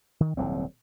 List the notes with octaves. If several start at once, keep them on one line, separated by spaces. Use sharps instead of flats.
D#3
D#1 C2 F#3 C4